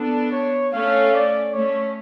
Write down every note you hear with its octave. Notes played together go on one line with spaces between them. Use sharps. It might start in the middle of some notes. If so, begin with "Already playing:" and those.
Already playing: B3 D4 A4
C#5
A3 C#4 F5
D5
A3 C#4 C#5